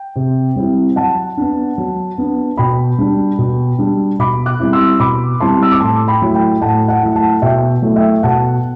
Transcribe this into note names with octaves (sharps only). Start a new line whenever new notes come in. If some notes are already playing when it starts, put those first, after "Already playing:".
Already playing: G5
C3
G3 C4 E4
F#3 F#5 A5
B3 D4
F#3
B3 D4
B2 G5 B5
G3 D4
B2
G3 D4
B2 B5 D6
D6 F#6
G3 C4 E4
C6 E6
B2 B5 D6
G3 C4 E4 A5 C6
E6
D6
A2 A5 C6
G5 B5
F#3 A3 E4
G5 B5
A2 F#5 A5
F#5 A5
F#3 A3 E4
F#5 A5
B2 E5 G5
F#3 A3 E4
E5 G5
B2 F#5 A5